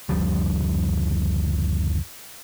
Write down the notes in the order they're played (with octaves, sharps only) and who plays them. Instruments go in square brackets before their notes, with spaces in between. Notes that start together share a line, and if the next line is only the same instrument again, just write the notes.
[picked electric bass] F#1 D2 F3 G3